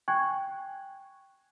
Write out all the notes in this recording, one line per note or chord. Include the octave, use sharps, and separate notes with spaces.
G5 G#5 C#6 F#6 G#6